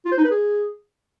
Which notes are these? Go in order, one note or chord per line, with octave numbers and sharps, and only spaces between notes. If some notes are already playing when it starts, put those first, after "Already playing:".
F4
C5
D#4
B4
G#4